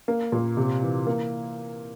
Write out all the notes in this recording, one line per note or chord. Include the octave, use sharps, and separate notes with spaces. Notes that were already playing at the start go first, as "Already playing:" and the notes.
A#3
A#2
C3
E3
A#3